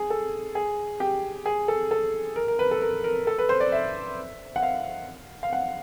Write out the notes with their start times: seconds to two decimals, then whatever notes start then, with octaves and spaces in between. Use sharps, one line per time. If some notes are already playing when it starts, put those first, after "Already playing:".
Already playing: G#4
0.10 A4
0.55 G#4
1.00 G4
1.46 G#4
1.68 A4
1.91 A4
2.36 A#4
2.48 A#4
2.59 B4
2.71 A4
2.82 A#4
3.04 A#4
3.27 A4
3.38 B4
3.49 C5
3.60 D5
3.72 E5
4.56 F#5
4.62 F5
5.43 F5
5.53 F#5